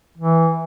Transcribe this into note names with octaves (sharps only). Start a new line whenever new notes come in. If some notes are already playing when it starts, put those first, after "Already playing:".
E3